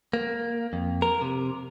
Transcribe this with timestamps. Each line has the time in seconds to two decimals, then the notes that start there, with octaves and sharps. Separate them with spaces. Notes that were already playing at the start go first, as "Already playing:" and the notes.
0.13 A#3
0.73 F2
1.02 A#4
1.22 C3